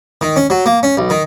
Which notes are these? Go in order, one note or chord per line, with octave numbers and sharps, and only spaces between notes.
D#3
C#4
F#3
A#3
C#4
B1
D#3